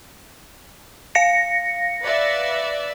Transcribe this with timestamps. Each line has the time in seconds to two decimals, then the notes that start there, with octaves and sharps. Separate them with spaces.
1.15 F5 A#6 C#7
2.02 B4 D5 E5